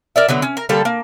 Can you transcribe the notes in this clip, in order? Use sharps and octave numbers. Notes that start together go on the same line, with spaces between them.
A#4 D5 E5
D3 F#3 B3
C#4
A#4
D3 G3 A#3 A4
A#3